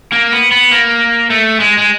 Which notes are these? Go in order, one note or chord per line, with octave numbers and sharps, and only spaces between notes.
A#3
B3
B3
A#3
A3
G#3
G#3